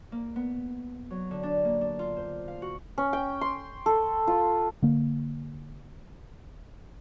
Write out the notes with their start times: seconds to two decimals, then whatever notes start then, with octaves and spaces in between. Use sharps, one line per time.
0.12 A#3
0.36 B3
1.10 F#3
1.31 D3
1.43 D4
1.65 A#3
1.81 D4
1.99 F4
2.16 C5
2.48 F5
2.62 F#4
2.98 C#4
3.13 G5
3.41 C6
3.86 A4
4.27 F4
4.82 D3 A#3